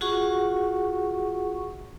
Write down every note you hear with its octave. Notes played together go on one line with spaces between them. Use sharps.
F4 F#4 G#4 F#5 C#6